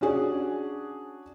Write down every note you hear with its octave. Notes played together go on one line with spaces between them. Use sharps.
C#4 D4 F#4 G#4 D5